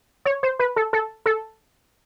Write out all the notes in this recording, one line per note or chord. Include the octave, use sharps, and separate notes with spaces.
C#5
C5
B4
A4
A4
A4